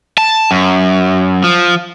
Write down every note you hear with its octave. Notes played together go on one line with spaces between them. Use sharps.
A5
F#2
F3